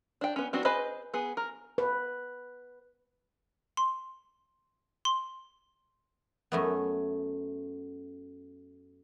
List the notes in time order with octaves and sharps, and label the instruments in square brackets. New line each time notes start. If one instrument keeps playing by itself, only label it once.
[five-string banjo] D4 G5
B3 C#4
B3 C4 D4 F#4
G#4 B4 C5 D#5
B3 G#4
A#4
[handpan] B4
[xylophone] C6
C6
[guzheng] F#2 A3 B3